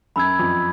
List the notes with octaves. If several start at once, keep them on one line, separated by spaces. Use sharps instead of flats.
F#2 B5 E6 G#6
F2